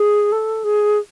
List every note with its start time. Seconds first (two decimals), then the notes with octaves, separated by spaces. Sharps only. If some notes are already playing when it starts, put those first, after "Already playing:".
Already playing: G#4
0.32 A4
0.64 G#4